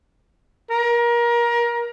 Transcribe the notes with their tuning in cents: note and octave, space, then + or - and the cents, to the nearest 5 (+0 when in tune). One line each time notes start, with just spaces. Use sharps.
A#4 +25